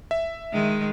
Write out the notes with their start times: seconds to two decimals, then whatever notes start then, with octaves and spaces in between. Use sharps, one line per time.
0.11 E5
0.53 D#3 G#3